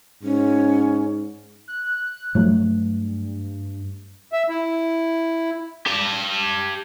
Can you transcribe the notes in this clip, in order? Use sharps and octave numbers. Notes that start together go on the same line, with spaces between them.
G#2 C#4
F#6
G2 F3 F#3 A3
E5
E4
G4 A5